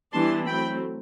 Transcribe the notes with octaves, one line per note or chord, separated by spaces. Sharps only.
E3 G3 B3 D4 A5 C6
F#3 A3 C4 G5 B5